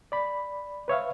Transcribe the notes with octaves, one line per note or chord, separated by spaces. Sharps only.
D5 B5
B4 C#5 E5 F5